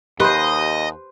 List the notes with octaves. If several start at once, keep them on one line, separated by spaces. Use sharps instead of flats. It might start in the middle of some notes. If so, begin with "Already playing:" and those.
D#2 G4 B4 C5 D#5 C6